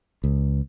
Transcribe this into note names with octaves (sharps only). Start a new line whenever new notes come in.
C#2